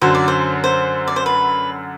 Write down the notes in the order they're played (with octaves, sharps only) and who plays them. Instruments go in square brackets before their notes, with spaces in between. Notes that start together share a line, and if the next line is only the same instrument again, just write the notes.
[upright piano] F#2 D3 F#3 [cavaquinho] C5
[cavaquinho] D5
C5
C5
D5
C5
B4